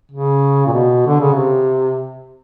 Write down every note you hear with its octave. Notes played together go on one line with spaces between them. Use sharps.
C#3
A#2
B2
D3
C#3
C3